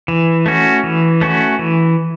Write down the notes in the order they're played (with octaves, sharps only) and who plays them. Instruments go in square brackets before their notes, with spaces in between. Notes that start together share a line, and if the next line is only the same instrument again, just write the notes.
[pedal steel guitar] E3
A3 C#4 F#4
E3
A3 C#4 F#4
E3